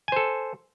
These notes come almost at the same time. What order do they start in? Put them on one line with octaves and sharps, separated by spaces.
G#5 C5 A4